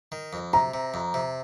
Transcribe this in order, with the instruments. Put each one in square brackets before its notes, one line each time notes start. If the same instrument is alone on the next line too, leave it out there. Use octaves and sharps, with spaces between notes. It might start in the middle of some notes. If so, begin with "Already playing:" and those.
[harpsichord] D#3
F2
[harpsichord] C3 [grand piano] A#5
[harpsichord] C3
F2
C3